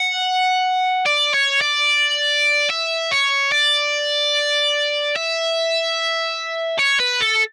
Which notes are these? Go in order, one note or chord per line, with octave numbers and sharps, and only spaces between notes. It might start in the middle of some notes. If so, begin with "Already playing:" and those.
Already playing: F#5
D5
C#5
D5
E5
C#5
D5
E5
C#5
B4
A4